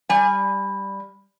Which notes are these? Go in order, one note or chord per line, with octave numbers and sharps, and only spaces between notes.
G3 G#5